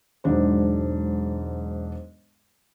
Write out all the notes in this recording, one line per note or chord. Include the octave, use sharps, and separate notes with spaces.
E1 G#2 F#3 D4 C5